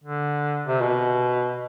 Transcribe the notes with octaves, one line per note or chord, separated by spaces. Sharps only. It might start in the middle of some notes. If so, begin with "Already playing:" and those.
D3
C3
B2